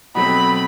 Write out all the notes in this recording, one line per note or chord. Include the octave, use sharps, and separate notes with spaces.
B2 F#3 A3 C4 B5